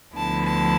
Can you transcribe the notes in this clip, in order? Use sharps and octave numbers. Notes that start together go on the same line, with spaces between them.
D2 D3 F3 B3 E4 A5
A5